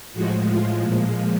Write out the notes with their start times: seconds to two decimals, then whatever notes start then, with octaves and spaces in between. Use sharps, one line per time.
0.13 A2 F3 G#3 F#4
0.48 F4
0.81 A#2 F3 G#3